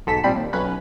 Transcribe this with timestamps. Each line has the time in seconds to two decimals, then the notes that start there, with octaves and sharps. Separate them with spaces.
0.07 B1 G#2 A4 B6 E7
0.23 G#1 A#2 G3 C4 B5 C7
0.36 D#2
0.53 B1 C#4 B4 B5